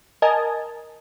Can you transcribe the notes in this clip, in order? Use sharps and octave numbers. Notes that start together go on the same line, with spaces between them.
A#4 D#5 G#5 A5